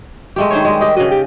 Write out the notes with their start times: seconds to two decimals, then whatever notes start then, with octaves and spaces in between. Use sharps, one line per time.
0.36 G#3 A3 G4
0.50 D#3 C5 C#5
0.65 G3 G#3
0.81 G4 D#5
0.96 C#3 F#4 D#5
1.11 G4